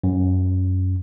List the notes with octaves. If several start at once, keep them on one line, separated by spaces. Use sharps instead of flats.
F#2